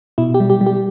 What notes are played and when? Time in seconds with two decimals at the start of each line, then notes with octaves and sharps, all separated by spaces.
0.18 B2 E4
0.34 G4
0.40 G3
0.50 G4
0.61 G3
0.66 G4